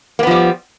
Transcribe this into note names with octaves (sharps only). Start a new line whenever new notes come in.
F3 G3 A#3 B3